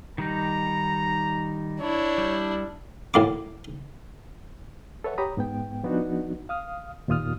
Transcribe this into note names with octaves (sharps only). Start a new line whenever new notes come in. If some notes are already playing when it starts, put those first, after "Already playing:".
D#3 G3 D#4 A#5
D4 E4 C#5
G3
A2 A#3 D6
A4 B4 C#5 E5 F#5 A5
G4 C#5 A#5 B5 D#6
G#2 B3 G5
F3 B3 D4 D#4 F#4
F5 D#6 F6
D#2 A#2 F4 D#6 F6